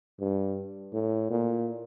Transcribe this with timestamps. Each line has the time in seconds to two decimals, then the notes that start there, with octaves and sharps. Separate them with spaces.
0.20 G2
0.93 A2
1.30 A#2